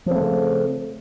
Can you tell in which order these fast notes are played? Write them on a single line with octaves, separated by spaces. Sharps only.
F3 C4 A3 C#3